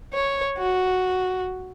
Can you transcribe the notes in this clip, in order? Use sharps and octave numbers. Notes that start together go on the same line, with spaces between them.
C#5
F#4